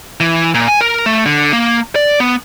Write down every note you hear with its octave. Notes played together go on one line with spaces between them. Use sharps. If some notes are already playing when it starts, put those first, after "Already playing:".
E3
A#2
G#5
A#4
A3
D3
A#3
D5
B3